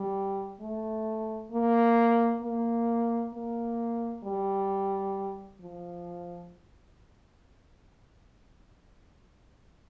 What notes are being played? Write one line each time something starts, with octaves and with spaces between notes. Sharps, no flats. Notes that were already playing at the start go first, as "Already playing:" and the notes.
Already playing: G3
A3
A#3
A#3
A#3
G3
F3